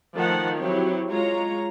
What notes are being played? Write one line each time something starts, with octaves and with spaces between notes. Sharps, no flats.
D#3 F3 A3 F#5 A5
F#3 C4 E4 G4 C#5
G#3 F4 C#5 A#5